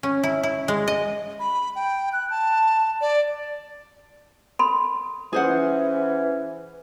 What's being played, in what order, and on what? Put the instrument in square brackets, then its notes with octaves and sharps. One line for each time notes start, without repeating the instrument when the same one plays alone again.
[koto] C#4
E4
E4
G#3
D#5
[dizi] B5
G5
F#6
A5
D5
[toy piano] A4 B5 C6
[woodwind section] E3 C#4 [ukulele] G#4 C5 F#5